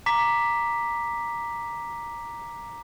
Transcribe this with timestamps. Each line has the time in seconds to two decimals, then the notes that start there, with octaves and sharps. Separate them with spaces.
0.06 A#5 D6 B6